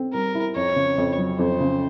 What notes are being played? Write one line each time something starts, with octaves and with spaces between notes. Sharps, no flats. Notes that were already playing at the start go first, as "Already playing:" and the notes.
Already playing: C4 A4
G3 A#4
E4
F2 C#5
C#3
F2
F#3
F2 C5
C#3